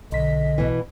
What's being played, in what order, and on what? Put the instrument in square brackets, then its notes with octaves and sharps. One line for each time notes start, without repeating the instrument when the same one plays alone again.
[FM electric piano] B1 B6 [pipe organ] D3 [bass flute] D#5
[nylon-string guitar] B2 E3